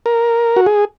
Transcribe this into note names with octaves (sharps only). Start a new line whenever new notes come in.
A#4
F#4
G#4